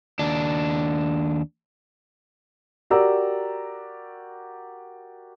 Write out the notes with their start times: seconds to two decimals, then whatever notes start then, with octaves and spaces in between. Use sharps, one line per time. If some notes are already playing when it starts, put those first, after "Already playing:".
0.19 D#2 D4
2.90 F#4 G4 A#4 D5 A#5 E6